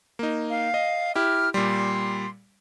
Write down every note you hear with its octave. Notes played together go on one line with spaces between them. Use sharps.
A#3 D#4
F5
D#5
E4 G4 F6
A#2 G3 C6